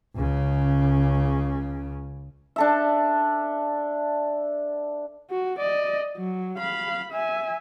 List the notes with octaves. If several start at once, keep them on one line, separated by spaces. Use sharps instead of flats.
C#2 C#3
D4 A4 E5
F#4
D5 D#5
F#3
F5 B5
E5 G#5